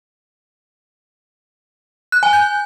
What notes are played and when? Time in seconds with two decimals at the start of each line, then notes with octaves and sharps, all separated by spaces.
2.12 F#6
2.23 G#5
2.33 G6